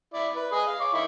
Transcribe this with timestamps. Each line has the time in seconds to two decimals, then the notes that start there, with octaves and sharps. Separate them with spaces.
0.14 E4 D5
0.36 B4
0.53 G#4 D#5 D#6
0.67 F5
0.80 C#5 D6
0.94 D#3 D#4 E4